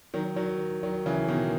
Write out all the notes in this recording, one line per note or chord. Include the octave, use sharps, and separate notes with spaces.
D#3 F#3
D#3 F#3
D#3 F#3
C#3 E3
B2 D#3